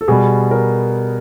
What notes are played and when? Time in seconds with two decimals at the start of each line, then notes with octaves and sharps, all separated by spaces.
0.01 A4
0.08 B2 G3 B3 G#4
0.51 A#4